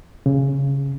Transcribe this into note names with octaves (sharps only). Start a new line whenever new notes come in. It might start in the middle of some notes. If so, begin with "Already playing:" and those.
C#3